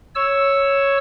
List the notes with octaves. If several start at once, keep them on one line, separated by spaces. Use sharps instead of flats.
C#5 E6